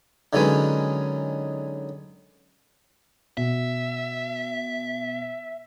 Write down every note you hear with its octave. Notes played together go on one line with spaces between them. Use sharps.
D3 D#3 F#3 G#3 C#4 B4
B2 E5